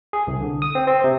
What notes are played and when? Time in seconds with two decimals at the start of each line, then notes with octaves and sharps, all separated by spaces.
0.13 G#4
0.27 C2
0.41 D3
0.62 D#6
0.75 C4
0.87 C4
1.04 C3